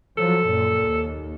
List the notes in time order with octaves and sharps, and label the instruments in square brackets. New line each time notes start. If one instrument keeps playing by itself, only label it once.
[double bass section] F3 F#3 [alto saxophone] A4
[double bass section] F#2 A#2
D#2